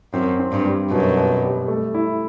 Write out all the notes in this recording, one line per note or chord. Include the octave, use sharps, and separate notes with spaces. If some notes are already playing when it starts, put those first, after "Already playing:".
F#2 C4
C4
G2
G3
F#2 B2
B2
G3
A3
E4